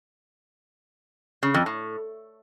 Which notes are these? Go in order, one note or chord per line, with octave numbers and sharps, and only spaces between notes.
C#3
F2
A2